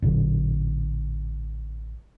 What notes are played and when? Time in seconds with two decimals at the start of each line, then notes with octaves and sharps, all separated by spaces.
0.02 A1 A#2 D3 F#3